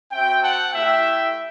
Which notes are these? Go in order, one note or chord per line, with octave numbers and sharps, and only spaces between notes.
C4 F#4 E5 G5
F#5 A5
A3 E4 G4 E5 G5